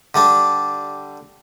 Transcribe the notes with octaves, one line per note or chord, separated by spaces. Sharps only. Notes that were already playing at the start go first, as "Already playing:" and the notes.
D3 G3 D4